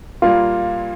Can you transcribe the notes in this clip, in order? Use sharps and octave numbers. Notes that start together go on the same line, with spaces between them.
A#2 G3 A#3 F4